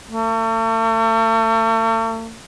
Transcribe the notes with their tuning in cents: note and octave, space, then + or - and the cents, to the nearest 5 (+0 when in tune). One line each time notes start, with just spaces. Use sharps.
A3 +40